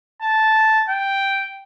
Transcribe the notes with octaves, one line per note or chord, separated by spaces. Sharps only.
A5
G5